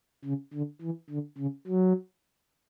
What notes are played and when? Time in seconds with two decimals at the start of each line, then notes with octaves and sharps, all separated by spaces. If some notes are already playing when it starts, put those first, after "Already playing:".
0.25 C#3
0.53 D3
0.82 E3
1.10 D3
1.38 C#3
1.67 F#3